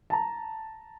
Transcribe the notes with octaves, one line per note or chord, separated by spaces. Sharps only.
A5 A#5